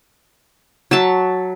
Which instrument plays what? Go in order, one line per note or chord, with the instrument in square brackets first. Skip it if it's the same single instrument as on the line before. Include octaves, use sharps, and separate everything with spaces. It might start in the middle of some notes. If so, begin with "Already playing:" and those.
[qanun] F#3 E5 A5